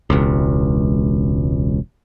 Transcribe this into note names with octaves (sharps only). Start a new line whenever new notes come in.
E1 C#2